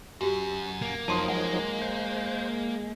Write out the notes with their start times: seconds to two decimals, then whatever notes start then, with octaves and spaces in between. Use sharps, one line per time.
0.21 F#2 F#4 G4
0.82 A#3
1.08 F2 F3 F#3 D#4 A5 C6 D#6
1.28 G#3 F#5
1.82 C5